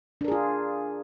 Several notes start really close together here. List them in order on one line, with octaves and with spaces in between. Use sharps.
D4 A#4 G#4 F4